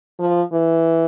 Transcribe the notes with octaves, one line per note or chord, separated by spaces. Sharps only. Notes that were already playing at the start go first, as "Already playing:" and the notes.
F3
E3